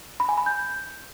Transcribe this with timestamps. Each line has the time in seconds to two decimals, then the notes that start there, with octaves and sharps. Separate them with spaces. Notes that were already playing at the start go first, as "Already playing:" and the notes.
0.20 B5
0.29 G#5
0.38 B5
0.46 G6